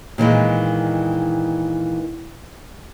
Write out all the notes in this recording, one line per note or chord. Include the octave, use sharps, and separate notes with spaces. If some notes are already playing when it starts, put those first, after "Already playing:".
A#2 D#3 E3 G#3